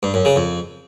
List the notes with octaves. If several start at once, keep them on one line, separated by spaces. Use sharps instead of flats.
G2
F#2
C#3
F2